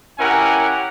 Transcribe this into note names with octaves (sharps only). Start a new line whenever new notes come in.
C#4 E4 G4 A#4 F#5 G#5